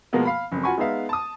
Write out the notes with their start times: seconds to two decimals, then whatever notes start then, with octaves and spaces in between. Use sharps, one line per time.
0.13 B2 F3 G#3 A#3 B3
0.25 F5 B5
0.52 F#1 F2
0.63 F4 F#4 G#5 B5 C#6
0.78 G#3 B3 D#4 B4 E5 F5
1.09 A5 D#6